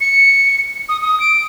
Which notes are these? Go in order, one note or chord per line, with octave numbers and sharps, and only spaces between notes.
C#7
D#6
D#6
D7